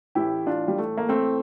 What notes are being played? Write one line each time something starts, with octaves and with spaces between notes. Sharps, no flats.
A1 A2 E3 E4 G4
D4 F4
G3
A3
A#3
A3 C4